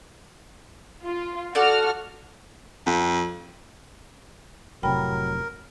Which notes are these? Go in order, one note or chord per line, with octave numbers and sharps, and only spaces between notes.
F4
F#4 A4 D5 A5 F6
F2
F1 A2 C3 F#3 A#4 G5 B5